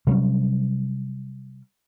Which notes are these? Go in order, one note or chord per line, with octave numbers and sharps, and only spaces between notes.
C3 F#3 G3 C#4